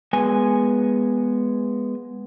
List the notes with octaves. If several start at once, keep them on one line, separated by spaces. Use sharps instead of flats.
G#3 B3 G#5